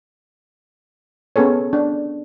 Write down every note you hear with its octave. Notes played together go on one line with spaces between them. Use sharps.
B3 C#4 G#4 A4 C#5
D4